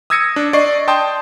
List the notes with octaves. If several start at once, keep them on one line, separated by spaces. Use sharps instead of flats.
D#6 E6 G#6 A#6 C#7 D#7
D4
D5 D#5 C#6 C7
G5 A5 C6 D#6 G6